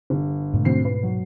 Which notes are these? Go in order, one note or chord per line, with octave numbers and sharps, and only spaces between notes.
G1
G#2 B2 A3
D2 C4 C7
B4
F#3